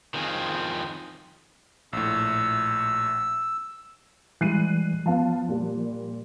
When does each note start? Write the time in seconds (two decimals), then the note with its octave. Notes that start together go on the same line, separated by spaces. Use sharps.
0.14 D#3 F3 C4 G#4
1.93 A#1 A2 E6
4.41 E3 G3 G#3 F#6 C7 D#7
5.06 F3 B3 F5 A5
5.48 A#2 G3